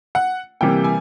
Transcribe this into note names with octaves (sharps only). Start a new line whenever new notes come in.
F#5
C3 E3 G3 A#3 G5
G#5